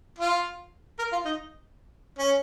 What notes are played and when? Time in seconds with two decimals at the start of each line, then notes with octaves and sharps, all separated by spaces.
0.18 F4
0.99 A#4
1.12 F4
1.25 D#4
2.19 C#4